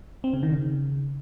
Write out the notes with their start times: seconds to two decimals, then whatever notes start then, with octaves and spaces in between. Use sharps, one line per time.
0.24 C4
0.33 C#3
0.43 D#3
0.52 C#3